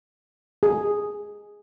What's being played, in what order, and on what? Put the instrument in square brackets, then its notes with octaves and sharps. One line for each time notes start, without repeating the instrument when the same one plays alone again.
[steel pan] G#4